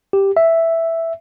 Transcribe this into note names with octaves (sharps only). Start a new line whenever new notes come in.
G4
E5